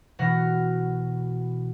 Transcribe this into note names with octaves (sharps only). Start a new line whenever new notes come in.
B2 E3 F#4 F#5 F6 A#6